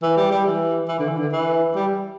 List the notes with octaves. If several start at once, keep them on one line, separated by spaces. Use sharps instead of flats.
E3
G3
G3
E3
E3
D3
E3
D3
E3
G3